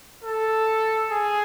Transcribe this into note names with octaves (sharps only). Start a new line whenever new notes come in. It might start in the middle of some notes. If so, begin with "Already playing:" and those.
A4
G#4